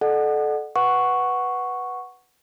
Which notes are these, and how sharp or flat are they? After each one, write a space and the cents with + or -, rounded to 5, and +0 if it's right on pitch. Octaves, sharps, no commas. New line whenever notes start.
A4 -20 D5 +45 F#5 +0
B4 +0 F#5 +0 C#6 +0